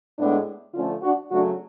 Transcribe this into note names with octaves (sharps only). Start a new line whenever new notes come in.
A2 G#3 B3 D4
D3 F3 A3 C#4 F4
D4 F#4
C#3 F#3 A3 D4 F#4